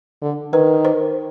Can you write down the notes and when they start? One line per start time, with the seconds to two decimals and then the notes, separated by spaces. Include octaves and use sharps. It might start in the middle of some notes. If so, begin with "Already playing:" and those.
0.22 D3
0.53 D#3 B4
0.85 C5